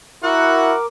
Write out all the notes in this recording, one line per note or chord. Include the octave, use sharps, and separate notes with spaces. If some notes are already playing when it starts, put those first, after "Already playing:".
E4 F#4 A#4 F#5 D6